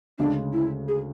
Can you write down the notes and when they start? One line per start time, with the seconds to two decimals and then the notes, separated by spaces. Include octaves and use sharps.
0.19 D2 C#3 G#3 D4
0.53 E4
0.88 G#4